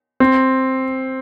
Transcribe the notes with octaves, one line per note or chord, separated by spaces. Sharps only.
C4